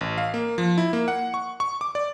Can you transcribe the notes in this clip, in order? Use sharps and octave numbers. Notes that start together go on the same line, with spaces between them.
A1
F5
A#3
F3
E4
A#3
F#5
C#6
C#6
D6
D5